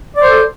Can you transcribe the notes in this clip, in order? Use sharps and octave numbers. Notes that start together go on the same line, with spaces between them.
A4 C5 D5